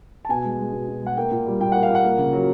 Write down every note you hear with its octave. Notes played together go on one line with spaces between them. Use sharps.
A5
B2 G#5
G#3
G#3
B2
B2
G#3 F#5
A#3 G5
A#2
G3
A#2 G5
A#3 F#5
F5
A#2 F#5
A#3
C#3
F#3